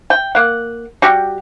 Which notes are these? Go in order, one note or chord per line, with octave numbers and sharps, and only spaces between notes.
G5
A#3 F#5
G3 F#4 G4